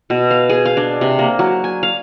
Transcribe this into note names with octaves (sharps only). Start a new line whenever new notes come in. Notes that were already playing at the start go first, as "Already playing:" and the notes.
B2
F5
G#4
F5
D4
C3
A#3
F#3
G#5
F5